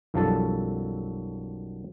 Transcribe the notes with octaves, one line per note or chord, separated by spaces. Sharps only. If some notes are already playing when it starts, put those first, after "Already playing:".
B1 F#2 F3 G3 A4 A5